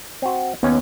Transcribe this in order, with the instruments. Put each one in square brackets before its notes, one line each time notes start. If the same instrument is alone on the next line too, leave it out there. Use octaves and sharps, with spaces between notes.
[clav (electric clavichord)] C4 F#4
[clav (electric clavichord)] D#2 C#4 [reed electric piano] B3